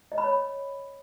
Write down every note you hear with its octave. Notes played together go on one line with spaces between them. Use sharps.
D#5
B5
C#5